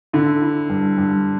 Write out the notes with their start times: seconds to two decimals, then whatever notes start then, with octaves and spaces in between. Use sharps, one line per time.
0.13 D3 E4
0.42 E4
0.69 G2
0.98 G2